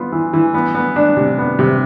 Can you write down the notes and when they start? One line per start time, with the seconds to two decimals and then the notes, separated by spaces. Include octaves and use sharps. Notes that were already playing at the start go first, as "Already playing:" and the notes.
Already playing: B3 F4
0.12 E3
0.33 E3
0.54 B3
0.75 B3
0.96 D4
1.17 C3
1.38 B3
1.59 C3